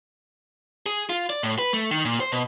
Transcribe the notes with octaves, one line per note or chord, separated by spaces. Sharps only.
G#4
F4
D5
A2
B4
A3
D#3
A#2
C5
B2